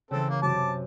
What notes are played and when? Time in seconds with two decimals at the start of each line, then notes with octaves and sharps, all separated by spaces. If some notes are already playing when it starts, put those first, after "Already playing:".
0.11 C#3 E3 C4 A4
0.29 A#3
0.42 F#2 C3 A5 D6